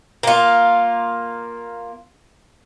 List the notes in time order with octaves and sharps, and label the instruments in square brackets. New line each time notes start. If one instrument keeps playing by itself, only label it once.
[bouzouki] A#3 F4